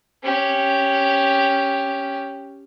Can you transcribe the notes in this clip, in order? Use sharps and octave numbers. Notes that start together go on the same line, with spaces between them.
C#4 G4